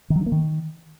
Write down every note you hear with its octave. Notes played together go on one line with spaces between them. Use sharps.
D#3
F#3
D4
A#3
D#3